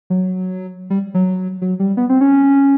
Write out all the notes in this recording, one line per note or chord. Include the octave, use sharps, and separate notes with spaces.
F#3
G3
F#3
F#3
G3
B3
C4
C#4